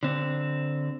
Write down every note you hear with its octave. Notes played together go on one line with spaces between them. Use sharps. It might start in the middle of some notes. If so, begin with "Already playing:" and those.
D3 C4